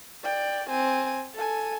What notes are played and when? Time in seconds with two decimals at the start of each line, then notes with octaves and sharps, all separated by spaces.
0.24 D5 G5
0.70 C4 G#5
1.35 A4 G#5